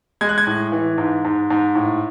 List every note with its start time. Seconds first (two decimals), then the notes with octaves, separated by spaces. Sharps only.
0.21 G#3 G#6
0.29 F#6
0.38 G#6
0.47 A2
0.72 E3
0.98 G#2
1.25 G#2
1.50 G#2
1.75 A2